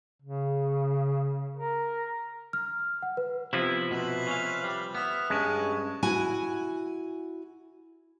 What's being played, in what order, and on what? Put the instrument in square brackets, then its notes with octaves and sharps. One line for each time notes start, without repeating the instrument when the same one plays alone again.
[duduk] C#3
A#4
[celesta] F6
F#5
B4
[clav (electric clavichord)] C3 F3 [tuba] B3 [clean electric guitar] E4
[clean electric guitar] B2 [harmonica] B4 C5 E5
[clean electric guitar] C#4 F5
G3
[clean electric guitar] B3 [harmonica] E5 F6
[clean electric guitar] G2 [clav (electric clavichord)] G#3 [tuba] C#4 [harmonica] G#5 A5 C#6
[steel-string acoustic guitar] E4 F#4 G#5